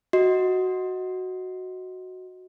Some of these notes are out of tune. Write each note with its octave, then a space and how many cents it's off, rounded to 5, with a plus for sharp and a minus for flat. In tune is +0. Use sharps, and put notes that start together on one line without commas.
F#4 +0 D#5 +15